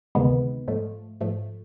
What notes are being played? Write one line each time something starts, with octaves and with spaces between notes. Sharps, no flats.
D2 C3 D#3 G#3 B3
G#2 F3 A3
G#2 F3 A3